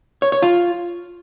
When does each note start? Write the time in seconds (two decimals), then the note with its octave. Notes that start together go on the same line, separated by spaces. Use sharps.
0.22 C#5
0.32 C#5
0.42 F4